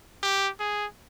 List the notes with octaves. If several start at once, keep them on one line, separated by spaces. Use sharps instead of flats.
G4
G#4